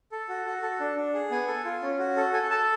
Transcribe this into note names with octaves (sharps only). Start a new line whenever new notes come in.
A4
F#4
F#4
A4
D4
D4
G#4
B3 G#5
A4
F4
C#4
F#4
A4
A4 G#5
A4 A5